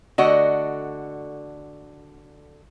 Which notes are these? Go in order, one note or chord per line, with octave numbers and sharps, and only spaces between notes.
D3 A3 F#4 D5 D#5